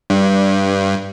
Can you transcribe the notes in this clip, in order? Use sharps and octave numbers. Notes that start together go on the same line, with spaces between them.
G2